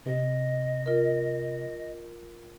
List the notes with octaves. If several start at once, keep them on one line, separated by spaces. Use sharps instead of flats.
C3 D#5
F4 A#4